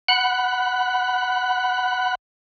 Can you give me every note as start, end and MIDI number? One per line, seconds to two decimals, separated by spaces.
0.09 2.15 78
0.09 2.15 83
0.09 2.15 90